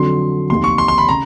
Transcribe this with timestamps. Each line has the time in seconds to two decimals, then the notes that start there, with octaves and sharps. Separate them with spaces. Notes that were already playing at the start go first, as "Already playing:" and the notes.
Already playing: F2 D3 F#3 C6
0.49 F1 D#2 D#3 C6
0.64 C#6
0.78 C6
0.88 C6
0.98 B5
1.09 C#3 A#5